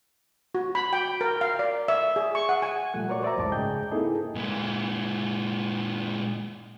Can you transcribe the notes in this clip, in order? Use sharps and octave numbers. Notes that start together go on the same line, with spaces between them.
F#4
B5
G5
A#4
F5
D5
E5
G#4
C#6
F#5
G#5
A#2 F3 G3 A3 F#5
F#4 A#4 C#5 D5 C#6
C5 D5 E5 A#5
C2 F2 A2 G#3 A5 D6
G#2 C#3 G#4 D#5 G5 G6
A#3 C4 D#4 E4 G#4 A4
A#2 G#3